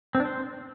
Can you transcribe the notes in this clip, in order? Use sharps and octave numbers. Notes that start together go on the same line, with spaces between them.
C4
D4
C5